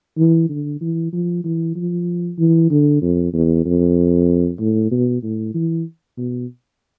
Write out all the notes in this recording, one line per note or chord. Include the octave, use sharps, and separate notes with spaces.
E3
D3
E3
F3
E3
F3
E3
D3
F2
E2
F2
A2
B2
A2
E3
B2